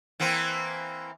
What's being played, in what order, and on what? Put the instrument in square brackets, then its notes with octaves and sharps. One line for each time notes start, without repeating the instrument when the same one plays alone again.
[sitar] E3 A#3 C4